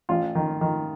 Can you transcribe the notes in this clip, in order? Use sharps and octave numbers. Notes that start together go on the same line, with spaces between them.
A1 F4
D#3
D#3